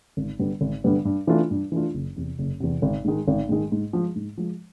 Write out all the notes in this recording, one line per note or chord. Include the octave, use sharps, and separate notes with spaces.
G#1
G2 D3 G3 B3
G#1
G2 D3 G3 B3
G2
E3 A3 D4 F4
G2
E3 A3 D4 F4
F#1
E2 C3
F#1
E2 C3
G#1
G#2 D#3 G#3
G#1
G#2 D#3 G#3
G#2
F3 G#3
G#2
F3 G#3